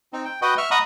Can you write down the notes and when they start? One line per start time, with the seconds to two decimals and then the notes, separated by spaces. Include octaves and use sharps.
0.13 C4 D#4
0.25 G5
0.42 F#4 B4 D#5 F#5 G5
0.58 E5 C#6 F6
0.71 D#5 F#5 A#5 B5 C#6 D#6